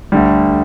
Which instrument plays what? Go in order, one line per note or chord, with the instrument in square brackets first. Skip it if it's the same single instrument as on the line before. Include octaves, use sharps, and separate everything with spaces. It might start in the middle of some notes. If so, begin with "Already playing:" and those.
[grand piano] D2 D3 G3